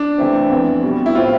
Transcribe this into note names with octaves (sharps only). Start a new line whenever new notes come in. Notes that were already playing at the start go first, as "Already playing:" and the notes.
Already playing: D4
C3 E3 A3 C4
F2 E3 B3
B2 G3 B3
E4
A2 G3 C4 F4